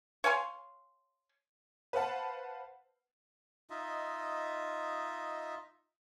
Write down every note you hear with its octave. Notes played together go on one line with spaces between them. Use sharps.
C#5 F5 G#5 C6
B4 C5 F5 F#5 A5 B5
D#4 F4 D#5 E5